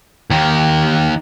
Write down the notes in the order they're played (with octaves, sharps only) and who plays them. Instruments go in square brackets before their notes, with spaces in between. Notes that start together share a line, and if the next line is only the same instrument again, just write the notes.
[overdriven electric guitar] D#2 D#3